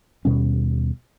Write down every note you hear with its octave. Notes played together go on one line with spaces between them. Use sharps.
D#2 B2 G3 C#4